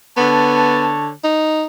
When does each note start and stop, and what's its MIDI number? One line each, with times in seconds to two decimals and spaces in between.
0.17 1.09 50
0.17 0.95 59
0.17 1.09 73
0.17 1.09 81
1.24 1.66 63